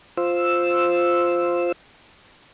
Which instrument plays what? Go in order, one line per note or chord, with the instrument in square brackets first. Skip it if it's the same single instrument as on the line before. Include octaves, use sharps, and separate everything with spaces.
[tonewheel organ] F4 C5 E6